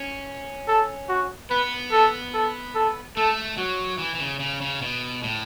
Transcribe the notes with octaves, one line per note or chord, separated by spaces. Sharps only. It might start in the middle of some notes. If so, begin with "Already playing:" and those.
Already playing: C#4
A4
F#4
B3 B4
A4
A4
A4
A3 A4
F#3 F#4
E3
E3
C#3
C#3
C#3
B2
A2